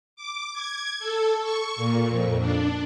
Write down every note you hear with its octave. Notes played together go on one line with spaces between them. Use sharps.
D6
G#6
A4
C#6
A#2
F2
D4